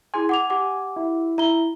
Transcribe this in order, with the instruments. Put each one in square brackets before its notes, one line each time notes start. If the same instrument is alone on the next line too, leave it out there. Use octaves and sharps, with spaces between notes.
[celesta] E4 G#4 C6 [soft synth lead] G#5
[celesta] F#5 D6 F7 [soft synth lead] G#5
[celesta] G4 F#5 D6
[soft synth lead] E4
[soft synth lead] E4 [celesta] A#5 G7